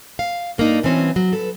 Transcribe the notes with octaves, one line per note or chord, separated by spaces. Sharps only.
F5
G2 A#3 D4 D#4
B2 E3 G3 C4 C#4 F#4
F#3
A4 B4